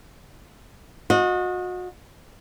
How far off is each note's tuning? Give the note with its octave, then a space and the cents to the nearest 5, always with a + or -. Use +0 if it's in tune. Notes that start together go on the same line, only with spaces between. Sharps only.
F#4 -35 D#5 +0